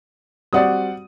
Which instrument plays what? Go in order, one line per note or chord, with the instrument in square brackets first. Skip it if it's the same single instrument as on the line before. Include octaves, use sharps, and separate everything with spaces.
[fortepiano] G3 C4 F#4 [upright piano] D5 F#5 D#6